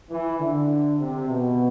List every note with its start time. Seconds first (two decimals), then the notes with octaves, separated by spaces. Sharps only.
0.10 E3
0.39 D3
0.99 C3
1.28 B2